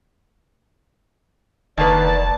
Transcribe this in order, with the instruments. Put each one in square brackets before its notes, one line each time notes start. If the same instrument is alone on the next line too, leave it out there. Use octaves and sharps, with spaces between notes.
[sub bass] F1 [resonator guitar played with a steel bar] D#3 A#3 B4 [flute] D5 [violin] A5